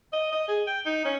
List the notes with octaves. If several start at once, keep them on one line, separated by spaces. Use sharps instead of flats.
D#5
D#5
G#4
G5
D#4
C#4